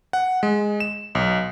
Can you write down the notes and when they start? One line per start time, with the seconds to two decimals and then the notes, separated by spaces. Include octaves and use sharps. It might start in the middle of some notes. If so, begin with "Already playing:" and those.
0.13 F#5
0.43 G#3
0.80 E7
1.15 B1